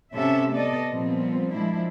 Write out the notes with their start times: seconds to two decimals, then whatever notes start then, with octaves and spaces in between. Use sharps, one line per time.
0.15 C3 C#4 A4 E5
0.53 B3 A4 D5 D#5
0.89 A#2 F3 G3 B3 C4
1.54 F3 G#3 D4 E4